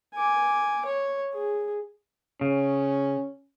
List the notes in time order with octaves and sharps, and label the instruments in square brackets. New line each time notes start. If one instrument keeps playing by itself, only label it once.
[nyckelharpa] G#5 D6
C#5
G#4
[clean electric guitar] C#3 [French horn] C#4